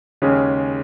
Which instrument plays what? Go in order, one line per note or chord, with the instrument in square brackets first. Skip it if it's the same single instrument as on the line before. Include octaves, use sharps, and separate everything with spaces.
[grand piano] D#2 C#3 G#3 [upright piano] C#4